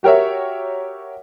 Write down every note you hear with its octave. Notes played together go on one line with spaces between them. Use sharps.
F#4 G4 A#4 C#5 E5